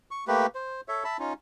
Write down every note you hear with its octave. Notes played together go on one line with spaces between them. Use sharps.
C#6
A3 A#3 G4 B4
C5
A4 C#5 E5
E5 A5 B5
C#4 D#4 F4